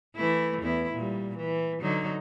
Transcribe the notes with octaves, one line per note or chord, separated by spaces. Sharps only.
E3 A3 E4
E2 E4
A#2 G3
E3
D3 F#3 D#4